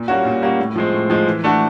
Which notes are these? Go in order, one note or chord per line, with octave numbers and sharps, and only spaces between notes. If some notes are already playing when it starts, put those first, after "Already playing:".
Already playing: A#2
G3 A#3 C#4 F#4
A#2
G3 A#3 C#4 F#4
A2
F3 G#3 C4
A2
F3 G#3 C4
E3
A3 D4 F#4